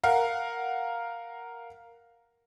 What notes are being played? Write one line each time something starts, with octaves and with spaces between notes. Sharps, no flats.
A#4 F5 F#5